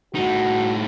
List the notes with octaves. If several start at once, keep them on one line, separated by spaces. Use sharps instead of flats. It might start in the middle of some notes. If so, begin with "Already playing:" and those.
A2 D#4 F#4